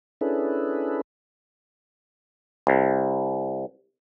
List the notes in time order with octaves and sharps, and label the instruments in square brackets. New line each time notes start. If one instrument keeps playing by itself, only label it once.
[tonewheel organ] C#4 D4 E4 G#4 A4 B4
[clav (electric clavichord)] C2